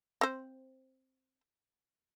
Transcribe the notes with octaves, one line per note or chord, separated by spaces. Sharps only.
C4 C5